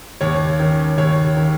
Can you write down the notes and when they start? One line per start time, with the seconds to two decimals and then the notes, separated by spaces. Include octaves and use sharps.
0.21 D#2 C#5
0.60 D#3 C#4
0.98 D#2 C#5
1.37 D#3 C#4